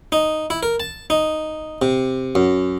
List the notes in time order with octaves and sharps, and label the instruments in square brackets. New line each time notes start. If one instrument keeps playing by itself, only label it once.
[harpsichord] D#4
E4
A#4
A5
D#4
C3
F#2